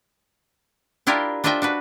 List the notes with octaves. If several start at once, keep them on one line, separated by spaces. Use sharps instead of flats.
D4 E4 F4 G4 A#4
D4 F4 C5 D#5 E5 G5
D4 F#4 B4